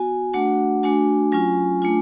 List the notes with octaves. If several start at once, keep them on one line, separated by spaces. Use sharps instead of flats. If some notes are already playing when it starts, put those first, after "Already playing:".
Already playing: B3 F#4 G#5
A3 D4 F#4 F#5
A3 D4 F#4 G#5
F#3 C#4 F4 G#5
A3 D4 F4